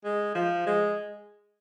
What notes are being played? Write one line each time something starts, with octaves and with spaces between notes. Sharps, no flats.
G#3
F3
G#3